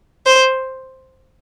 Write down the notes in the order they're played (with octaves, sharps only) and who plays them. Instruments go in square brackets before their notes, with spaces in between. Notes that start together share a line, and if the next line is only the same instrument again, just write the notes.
[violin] C5